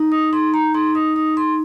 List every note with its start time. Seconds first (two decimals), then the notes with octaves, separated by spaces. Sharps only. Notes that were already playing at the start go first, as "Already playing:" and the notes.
Already playing: D#4
0.12 D#6
0.32 D#4 C6
0.54 A#5
0.74 D#4 C6
0.95 D#6
1.16 D#4 D#6
1.37 C6